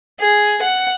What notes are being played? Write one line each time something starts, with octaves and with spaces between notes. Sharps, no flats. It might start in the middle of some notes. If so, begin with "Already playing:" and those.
G#4
F#5